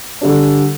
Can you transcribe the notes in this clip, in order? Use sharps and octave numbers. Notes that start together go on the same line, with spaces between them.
D3 G3 D4